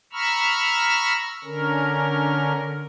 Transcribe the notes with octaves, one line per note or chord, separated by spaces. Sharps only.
A#5 B5 C#6 E6 F6
D3 C#4 A#4